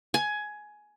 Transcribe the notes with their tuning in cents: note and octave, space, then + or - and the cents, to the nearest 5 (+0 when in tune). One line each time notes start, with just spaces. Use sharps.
G#5 +15